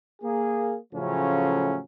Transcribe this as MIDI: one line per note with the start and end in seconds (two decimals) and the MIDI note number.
0.22 0.77 58
0.22 0.77 68
0.93 1.79 45
0.93 1.79 49
0.93 1.79 53
0.93 1.79 54
0.93 1.79 57
0.93 1.79 61